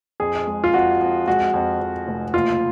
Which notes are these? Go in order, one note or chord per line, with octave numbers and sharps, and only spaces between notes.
F2 G#4
G#3
F4
F2 F#4
F2
G#3 F#4
F2
F2
F1
F#1 F4